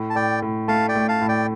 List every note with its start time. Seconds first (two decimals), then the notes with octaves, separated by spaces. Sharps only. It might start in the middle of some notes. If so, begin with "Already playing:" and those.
Already playing: A2
0.10 A5
0.16 A2 D5 G5
0.42 A2
0.68 A3 F5 A5
0.89 D5 G5
0.95 A3
1.08 F5 A5
1.21 A2
1.28 D5 G5